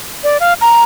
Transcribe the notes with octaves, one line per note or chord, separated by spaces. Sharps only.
D5
F5
A#5